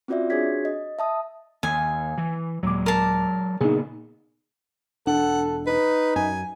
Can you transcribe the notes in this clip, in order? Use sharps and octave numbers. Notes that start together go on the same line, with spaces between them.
C4 C#4 F4 F#4 D5 E5
D4 F#4 G#4 C#5 G#6 B6
D#5
E5 A5 D#6
D#2 G#5
E3
D#2 A#2 F#3 G#3 D6
A#4 A5
A#2 C#3 B3 D#4 G#4
E1 D4 A4 F#5
D#4 B4
F#2 G#5